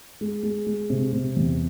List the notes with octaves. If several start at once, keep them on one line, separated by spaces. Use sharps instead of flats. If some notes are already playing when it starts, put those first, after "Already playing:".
G#3
G#3
G#3
C3
C3
E2